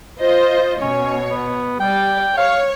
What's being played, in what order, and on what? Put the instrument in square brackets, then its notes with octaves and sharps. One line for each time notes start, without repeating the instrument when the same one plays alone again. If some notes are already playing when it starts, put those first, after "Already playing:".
[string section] F4 C5 D#5
[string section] B2 C#5 [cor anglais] C#4
[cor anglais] B3
[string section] G3 D5 [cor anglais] G5
[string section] C#5 [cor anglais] F5